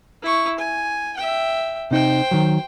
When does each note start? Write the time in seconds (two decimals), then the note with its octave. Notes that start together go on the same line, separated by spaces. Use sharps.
0.23 E4 C#6
0.59 G#5
1.17 E5 G5
1.91 C3 D#4 C5 G5
2.31 D#3 F#3